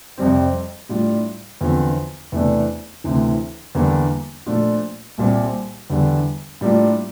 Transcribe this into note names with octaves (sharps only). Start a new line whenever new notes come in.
F2 C3 G3 C4
A2 G3 D4 F4
E2 D3 F3 C4
E2 C3 E3 A3 D4
D2 C3 E3
E2 D3 G3 A#3
A#2 F3 A3 D4 F4
C2 A#2 G3 C4
E2 D3 G3
A2 G3 A#3 D4 F4